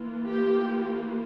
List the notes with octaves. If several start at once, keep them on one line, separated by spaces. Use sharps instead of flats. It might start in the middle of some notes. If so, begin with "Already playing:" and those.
Already playing: E3 A#3 F4
G4